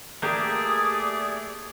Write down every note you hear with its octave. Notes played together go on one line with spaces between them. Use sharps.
A3 A#3 G4 G#4 D5 D#6